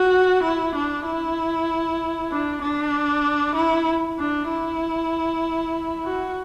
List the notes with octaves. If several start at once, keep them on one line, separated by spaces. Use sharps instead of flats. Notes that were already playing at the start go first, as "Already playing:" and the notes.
Already playing: F#4
E4
D4
E4
D4
D4
E4
D4
E4
F#4